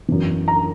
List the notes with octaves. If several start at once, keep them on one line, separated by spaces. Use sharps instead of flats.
F#2 E3
A#5